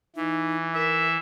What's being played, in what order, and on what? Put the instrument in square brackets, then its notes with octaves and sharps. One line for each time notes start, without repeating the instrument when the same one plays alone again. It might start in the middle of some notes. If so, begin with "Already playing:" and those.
[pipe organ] E3 [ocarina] D#4
[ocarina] A#4 [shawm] E5